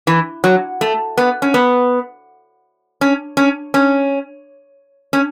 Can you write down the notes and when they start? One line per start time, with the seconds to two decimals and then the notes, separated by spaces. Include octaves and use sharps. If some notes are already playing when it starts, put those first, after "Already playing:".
0.07 E3
0.44 F#3
0.81 A3
1.17 B3
1.42 C#4
1.54 B3
3.01 C#4
3.37 C#4
3.74 C#4
5.13 C#4